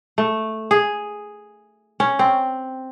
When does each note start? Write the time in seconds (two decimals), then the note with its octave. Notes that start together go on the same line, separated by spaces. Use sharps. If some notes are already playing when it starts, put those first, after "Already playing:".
0.18 A3
0.71 G#4
2.00 C#4
2.19 C4